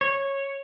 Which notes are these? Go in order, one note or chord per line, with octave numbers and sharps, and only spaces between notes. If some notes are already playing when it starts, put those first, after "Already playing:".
C#5